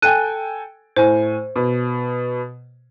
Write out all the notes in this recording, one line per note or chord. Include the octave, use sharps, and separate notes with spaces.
A4 G5 G#5 F#6 D#7
A2 C5 G#5
B2